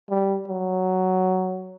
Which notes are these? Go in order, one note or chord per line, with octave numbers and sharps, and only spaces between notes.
G3
F#3